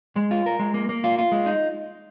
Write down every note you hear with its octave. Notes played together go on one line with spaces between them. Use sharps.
G#3
F4
A#4
G#3
A#3
A#3
F4
F4
G#3
D#4